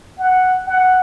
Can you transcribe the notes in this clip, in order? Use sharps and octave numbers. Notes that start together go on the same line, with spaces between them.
F#5
F#5